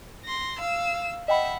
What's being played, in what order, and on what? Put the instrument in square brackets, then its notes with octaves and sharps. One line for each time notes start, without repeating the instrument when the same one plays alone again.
[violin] C6 A#6
F5 E6
[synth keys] D#5 G5 B5 [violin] E5 F#5